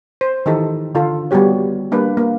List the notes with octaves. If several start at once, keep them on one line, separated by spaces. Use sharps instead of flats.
C5
D#3 E3 D#4 G4 A4
D3 F4 A4
G3 B3 F#4 G4 C#5
G3 A#3 D4 B4
A#3